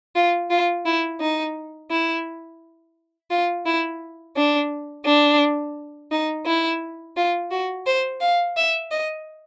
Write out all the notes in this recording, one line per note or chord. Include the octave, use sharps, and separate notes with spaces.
F4
F4
E4
D#4
E4
F4
E4
D4
D4
D#4
E4
F4
F#4
C5
F5
E5
D#5